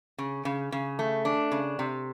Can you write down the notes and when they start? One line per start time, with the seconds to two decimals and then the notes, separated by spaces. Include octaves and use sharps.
0.18 C#3
0.45 C#3
0.72 C#3
0.99 A3
1.25 D4
1.52 C#3
1.79 C3